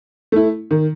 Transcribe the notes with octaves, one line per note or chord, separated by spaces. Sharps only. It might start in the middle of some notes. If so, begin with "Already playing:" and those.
A3 E4
D#3